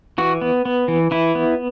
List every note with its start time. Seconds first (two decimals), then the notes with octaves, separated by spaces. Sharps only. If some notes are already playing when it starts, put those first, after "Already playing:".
0.18 E3 F#4
0.42 B3
0.65 B3
0.88 E3
1.11 E3 E4
1.35 B3